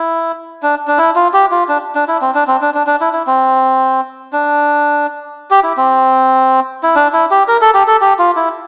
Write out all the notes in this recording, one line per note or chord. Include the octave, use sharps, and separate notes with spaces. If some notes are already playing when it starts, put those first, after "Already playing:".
Already playing: E4
D4
D4
E4
F4
G4
F4
D4
D4
E4
C4
D4
C4
D4
D4
D4
E4
E4
C4
D4
G4
E4
C4
E4
D4
E4
G4
A#4
A4
G4
A4
G4
F4
E4